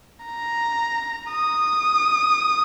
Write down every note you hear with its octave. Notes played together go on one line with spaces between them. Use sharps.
A#5
D#6